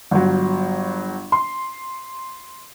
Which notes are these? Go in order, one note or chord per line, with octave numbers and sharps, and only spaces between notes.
G1 F#3
C6